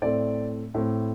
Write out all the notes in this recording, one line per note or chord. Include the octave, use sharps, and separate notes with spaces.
A2 A3 C4 D5
A2 A3 C4